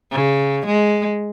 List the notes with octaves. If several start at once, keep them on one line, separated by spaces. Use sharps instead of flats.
C#3
G#3